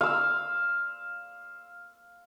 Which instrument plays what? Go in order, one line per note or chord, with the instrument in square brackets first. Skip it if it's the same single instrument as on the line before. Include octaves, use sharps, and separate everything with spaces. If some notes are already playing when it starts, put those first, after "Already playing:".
[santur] F5 E6